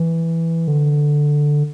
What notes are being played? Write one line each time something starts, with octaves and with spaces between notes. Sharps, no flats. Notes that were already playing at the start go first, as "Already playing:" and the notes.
Already playing: E3
D3